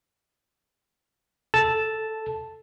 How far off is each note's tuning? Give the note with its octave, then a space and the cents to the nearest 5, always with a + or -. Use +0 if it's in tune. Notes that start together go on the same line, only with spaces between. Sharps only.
A4 +0 A5 +0